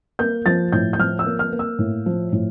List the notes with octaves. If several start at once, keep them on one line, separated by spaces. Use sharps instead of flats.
A#3 G6
F3 A6
A2 G6
G6
F3 F6
E6
A#3
F6
A#3
E6
A2
F3
A2